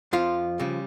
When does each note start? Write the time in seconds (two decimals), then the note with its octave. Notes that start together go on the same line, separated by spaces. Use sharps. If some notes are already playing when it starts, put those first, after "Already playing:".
0.13 F2 F3 F4
0.60 C#3 G3